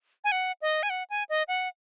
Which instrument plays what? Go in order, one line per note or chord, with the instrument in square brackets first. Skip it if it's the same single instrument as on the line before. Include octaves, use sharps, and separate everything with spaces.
[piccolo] G#5
F#5
D#5
G#5
F#5
G#5
D#5
F#5